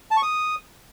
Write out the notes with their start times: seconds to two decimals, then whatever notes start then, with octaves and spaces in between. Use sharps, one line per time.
0.11 A5
0.17 C#6
0.23 D#6